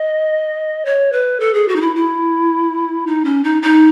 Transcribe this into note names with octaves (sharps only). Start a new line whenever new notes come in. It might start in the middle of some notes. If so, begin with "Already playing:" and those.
Already playing: D#5
C#5
B4
A4
G#4
F#4
D#4
E4
E4
D#4
C#4
D#4
D#4